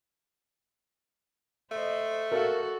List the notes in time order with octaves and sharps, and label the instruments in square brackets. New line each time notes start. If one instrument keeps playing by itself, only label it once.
[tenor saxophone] A3 [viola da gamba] C5 D#5
[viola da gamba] F#4 A4 [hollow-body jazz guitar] A#4 D5 F5